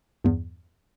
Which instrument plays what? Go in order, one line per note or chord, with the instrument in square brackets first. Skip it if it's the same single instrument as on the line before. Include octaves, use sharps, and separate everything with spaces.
[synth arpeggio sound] E2 G2